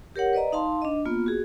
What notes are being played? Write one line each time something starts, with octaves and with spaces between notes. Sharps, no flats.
G4 A#4 C#5 F#5
B4 D5 D#5 A#5
D#4 F5 A5 C6
D4 D#5
A#3 B3 F4
F#4 G#4